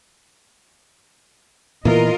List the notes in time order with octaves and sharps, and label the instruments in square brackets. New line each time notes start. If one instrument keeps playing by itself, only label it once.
[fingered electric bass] A#2 E3 B3 [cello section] F4 A#4 D#5